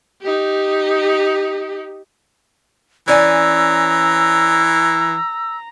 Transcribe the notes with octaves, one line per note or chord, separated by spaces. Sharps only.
D#4 G4
E3 C#4 D5 G#5 A#5 E6